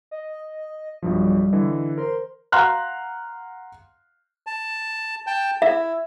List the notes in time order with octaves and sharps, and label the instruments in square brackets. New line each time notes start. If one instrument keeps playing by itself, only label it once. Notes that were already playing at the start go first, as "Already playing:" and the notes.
[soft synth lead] D#5
[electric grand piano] B1 G2 F3 [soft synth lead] G3
[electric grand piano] D3 E3 D#5
[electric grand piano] A#4 C5 [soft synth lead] C6
[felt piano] F5 F#5 A#5 C6 F6 F#6
[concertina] A5
G5 A5
[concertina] E4 [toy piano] E5